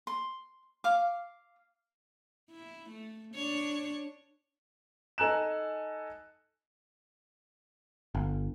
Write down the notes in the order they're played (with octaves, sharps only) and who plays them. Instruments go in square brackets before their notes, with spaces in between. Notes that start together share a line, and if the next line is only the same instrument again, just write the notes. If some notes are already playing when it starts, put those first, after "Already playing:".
[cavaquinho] C6
F5 D6
[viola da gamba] E4
A3
D4 C#5
[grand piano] D#4 A4 G#5 A#5 F#6 E7
[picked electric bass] G1